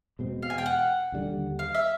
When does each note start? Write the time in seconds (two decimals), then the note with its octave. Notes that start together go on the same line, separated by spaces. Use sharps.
0.19 E2 B2 G#3 C4
0.42 F5
0.50 G#5
0.58 G5
0.66 F#5
1.12 D#2 D3 G3
1.59 F5
1.74 E5